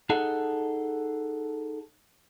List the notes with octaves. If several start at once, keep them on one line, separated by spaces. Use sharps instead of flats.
D#4 G#4 A4 D#5 F#5